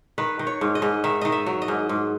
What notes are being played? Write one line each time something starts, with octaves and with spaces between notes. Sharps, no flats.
D#3 B4
D#3
C#5
G#2
D#5
G#2
D#3 E5
D#3 D#5
E5
F#3
D#5
G#2
G#2